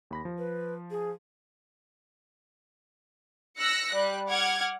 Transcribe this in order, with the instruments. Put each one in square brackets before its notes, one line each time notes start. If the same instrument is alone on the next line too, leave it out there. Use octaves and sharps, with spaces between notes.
[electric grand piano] D#2 B5 A#6
F3
[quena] B4
G#4
[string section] E6 F#6 A#6 C#7
G3 F#6
F#5 D6 F6 G#6